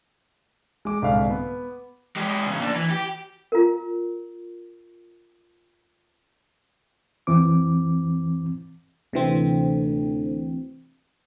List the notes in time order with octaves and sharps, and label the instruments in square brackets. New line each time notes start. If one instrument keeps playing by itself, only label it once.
[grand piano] G#3 D6
C2 G#2 D3 F5
B3
[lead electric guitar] G#3 G4
A2 C#3
A#3 D4
E3
G4
[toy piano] F4 A#4
[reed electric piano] F2 E3 C4 D6
[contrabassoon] D2 [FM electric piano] C3 E3 C4